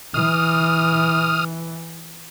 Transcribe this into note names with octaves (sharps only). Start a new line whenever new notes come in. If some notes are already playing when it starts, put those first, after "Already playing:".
E3 D#6 F6